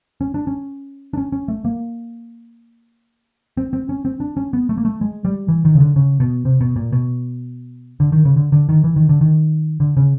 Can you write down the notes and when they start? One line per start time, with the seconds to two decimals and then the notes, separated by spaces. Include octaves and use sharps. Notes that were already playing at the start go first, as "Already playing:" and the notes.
0.21 C#4
0.34 D4
0.47 C#4
1.13 D4
1.18 C#4
1.32 C#4
1.48 A3
1.65 A#3
3.57 C4
3.73 C4
3.89 C#4
4.05 C4
4.20 D4
4.37 C#4
4.53 B3
4.69 A3
4.77 A#3
4.85 A3
5.01 G#3
5.25 G3
5.48 E3
5.65 D#3
5.75 C#3
5.80 D3
5.96 C#3
6.20 B2
6.45 C3
6.61 B2
6.76 A#2
6.93 B2
8.00 D3
8.12 D#3
8.25 C#3
8.36 D3
8.52 D3
8.69 D#3
8.84 E3
8.96 D#3
9.09 D3
9.21 D#3
9.80 D3
9.97 C#3